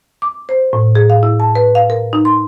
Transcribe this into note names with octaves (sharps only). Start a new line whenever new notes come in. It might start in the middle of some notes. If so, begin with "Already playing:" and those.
D6
C5
A2
G#4
F5
E4
A5
B4
F5
A#4
D#4
C6